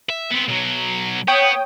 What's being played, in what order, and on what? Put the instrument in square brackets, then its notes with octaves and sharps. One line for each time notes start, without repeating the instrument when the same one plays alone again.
[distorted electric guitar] E5
B3 C4
B1 F#3
[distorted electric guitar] B3 [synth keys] C#5 G5 D#6